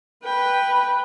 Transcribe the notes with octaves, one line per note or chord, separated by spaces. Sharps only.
B4 G5